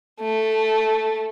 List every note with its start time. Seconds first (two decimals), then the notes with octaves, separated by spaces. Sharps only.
0.21 A3